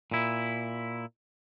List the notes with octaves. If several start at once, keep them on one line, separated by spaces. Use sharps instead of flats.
A#2 E4